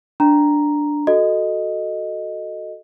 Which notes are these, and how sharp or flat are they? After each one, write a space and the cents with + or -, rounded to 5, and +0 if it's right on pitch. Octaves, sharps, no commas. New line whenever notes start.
D4 +0 A#5 +0
F#4 +0 A4 +0 D#5 +0